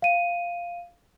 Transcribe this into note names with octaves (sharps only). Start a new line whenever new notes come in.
F5 D#7